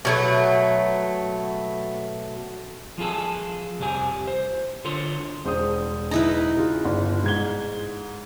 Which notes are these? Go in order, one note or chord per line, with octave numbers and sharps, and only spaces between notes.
B2 F#3 A3
F3 F4 G#4 A4
C2 F2 F3 G4 G#5
C5
D3 F4 A4 C#5 C6
E1 C5 D#6
D#4 E4 B4
C#3 F4
G1
G#2 G#6 G7